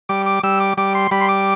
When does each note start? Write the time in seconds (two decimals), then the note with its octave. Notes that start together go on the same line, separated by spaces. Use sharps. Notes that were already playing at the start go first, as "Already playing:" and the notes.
0.09 G3 D6
0.26 D6
0.43 G3 E6
0.60 D6
0.77 G3 D6
0.95 C6
1.11 G3 B5
1.21 C6
1.29 D6